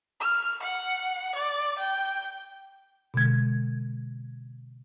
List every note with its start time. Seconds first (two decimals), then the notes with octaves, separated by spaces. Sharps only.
0.20 F6
0.62 F#5
1.35 D5
1.78 G5
3.14 B2 D3 G#3 G#6